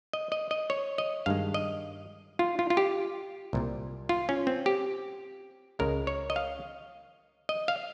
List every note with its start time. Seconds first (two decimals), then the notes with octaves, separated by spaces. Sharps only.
0.13 D#5
0.32 D#5
0.51 D#5
0.70 C#5
0.98 D#5
1.26 G2 D#3 G#3 F5
1.54 D#5
2.39 F4
2.59 F4
2.70 F4
2.77 G4
3.53 C2 A#2 G3
4.09 F4
4.29 C#4
4.47 C4
4.66 G4
5.79 C#2 C#3 G#3 A#4
6.07 C#5
6.30 D#5
6.36 F5
7.49 D#5
7.68 F5